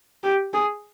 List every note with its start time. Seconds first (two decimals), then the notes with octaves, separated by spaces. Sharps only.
0.24 G4
0.54 G#4